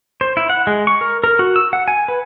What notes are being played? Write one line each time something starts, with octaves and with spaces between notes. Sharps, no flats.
C5
E4
F#5
G#3
C#6
A#4
A#4
F#4
E6
F#5
G#5
B4